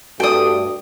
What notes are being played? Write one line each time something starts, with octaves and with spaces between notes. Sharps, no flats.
G2 A3 F#4 D5 G5 D#6